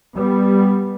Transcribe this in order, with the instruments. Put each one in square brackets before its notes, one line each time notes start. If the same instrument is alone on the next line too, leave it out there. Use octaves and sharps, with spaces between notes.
[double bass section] G3 B3